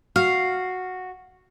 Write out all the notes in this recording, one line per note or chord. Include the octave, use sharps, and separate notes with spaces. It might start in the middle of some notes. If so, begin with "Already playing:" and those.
F#4 F5